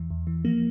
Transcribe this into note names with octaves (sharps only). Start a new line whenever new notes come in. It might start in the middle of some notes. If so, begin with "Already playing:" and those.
Already playing: E2 E3
E2
E3
F3 A#3